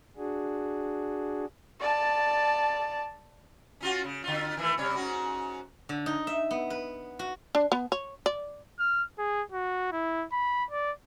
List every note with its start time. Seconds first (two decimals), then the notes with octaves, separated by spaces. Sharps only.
0.17 D4 F#4 G#4
1.80 D5 A5
3.81 C#4 F4 F#4
4.04 C#3
4.24 D3 F4
4.57 D#3 E3 A3
4.78 C3 G3 C#5
4.95 G#2 C#4 F#4
5.89 D3
6.06 D#4
6.27 E5
6.51 B3
6.70 B4
7.19 F#4
7.55 D4
7.72 B3
7.92 C#5
8.26 D5
8.79 F6
9.18 G#4
9.52 F#4
9.92 E4
10.32 B5
10.71 D5